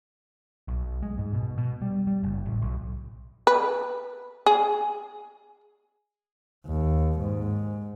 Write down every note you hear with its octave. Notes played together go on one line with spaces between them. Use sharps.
B1
G#3
G#2
B2
B2
G3
G3
F#1
A1
B1
B4
G#4
D#2
G#2